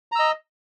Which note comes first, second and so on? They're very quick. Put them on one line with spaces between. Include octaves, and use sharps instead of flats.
A#5 E6 D#5